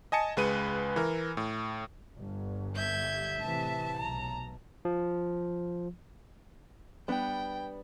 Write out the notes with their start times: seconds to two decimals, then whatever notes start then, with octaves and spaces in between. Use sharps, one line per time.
0.12 D#5 G#5 A5 C#7
0.37 C#2 G#3 B4 D#7
0.96 E3 A#4
1.37 A2
2.17 G1
2.76 E5 G6 G#6
3.40 A2 C3 E3 A5
3.98 B1 A#5
4.85 F3
7.08 G3 B3 D4 G5